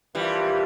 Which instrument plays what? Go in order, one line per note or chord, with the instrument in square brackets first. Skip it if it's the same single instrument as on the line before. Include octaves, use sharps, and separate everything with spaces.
[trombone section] A#2 F3 A#3 D4 F4 [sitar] E3 G3